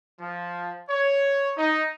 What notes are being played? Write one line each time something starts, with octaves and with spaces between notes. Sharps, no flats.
F3
C#5
D#4